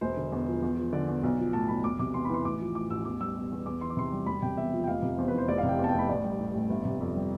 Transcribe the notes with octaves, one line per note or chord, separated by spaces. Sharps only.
E1 C5
D3
E2
F3
E2
F3
D3 D5
E2
B1
F3
A2 A5
B1 B5
E1 D6
C3 D6
E2 C6
B5
E3 C6
A1 D6
F3
A2 D6
A1 E6
E2 D6
G3 E6
B2
E2
E2 D6
E3 C6
D6
C3 C6
G3
E1 B5
C3 G5
E2 E5
F3
G5
F1 F5
C3
E2 C5
B4
E3 C5
F1 D5
F5
C3
G5
E2
A5
G5
F1 B5
A1 D5
G3
A2
A1
G1
C3
F2
G3